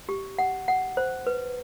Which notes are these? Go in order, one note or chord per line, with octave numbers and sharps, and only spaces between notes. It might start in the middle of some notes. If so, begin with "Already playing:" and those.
G4
F#5
F#5
C5
B4